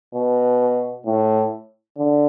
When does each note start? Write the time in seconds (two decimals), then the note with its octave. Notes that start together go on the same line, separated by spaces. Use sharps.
0.15 B2
1.06 A2
1.98 D3